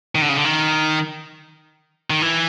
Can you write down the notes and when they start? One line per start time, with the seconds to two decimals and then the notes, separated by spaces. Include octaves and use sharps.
0.15 D#3
0.22 D3
0.29 C#3
0.37 D3
0.44 D#3
2.10 D#3
2.22 E3